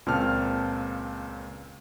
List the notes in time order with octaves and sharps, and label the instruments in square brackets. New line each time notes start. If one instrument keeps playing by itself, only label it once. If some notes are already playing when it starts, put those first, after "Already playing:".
[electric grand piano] C#2 A#2 C4 A5 F6